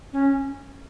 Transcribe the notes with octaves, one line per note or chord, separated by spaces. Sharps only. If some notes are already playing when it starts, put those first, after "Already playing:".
C#4